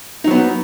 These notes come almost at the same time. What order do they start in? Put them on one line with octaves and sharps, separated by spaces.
D#4 F#3 B3